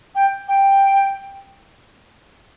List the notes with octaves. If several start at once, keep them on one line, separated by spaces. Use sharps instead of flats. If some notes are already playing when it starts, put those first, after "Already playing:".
G5
G5